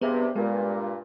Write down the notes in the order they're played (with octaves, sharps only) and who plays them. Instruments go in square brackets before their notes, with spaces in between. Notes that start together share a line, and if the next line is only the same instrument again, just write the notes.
[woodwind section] G2 C3 [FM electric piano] B3 G#4
[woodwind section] G2 A#2 [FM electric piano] G#3